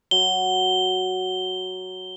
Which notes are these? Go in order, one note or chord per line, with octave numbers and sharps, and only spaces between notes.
F#3 G7